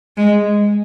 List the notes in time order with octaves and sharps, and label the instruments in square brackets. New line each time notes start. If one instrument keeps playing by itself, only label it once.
[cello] G#3